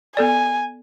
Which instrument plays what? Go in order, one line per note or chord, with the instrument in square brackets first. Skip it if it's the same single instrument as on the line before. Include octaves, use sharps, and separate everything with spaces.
[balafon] B3 A4 D5 [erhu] G#5